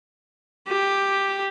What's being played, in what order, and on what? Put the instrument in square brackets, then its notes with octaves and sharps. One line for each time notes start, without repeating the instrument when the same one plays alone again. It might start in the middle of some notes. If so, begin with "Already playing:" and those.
[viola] G4